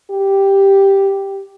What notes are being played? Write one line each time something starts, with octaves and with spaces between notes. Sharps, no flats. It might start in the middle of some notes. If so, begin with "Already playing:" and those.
G4